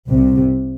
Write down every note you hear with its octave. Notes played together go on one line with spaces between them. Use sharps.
C2 C3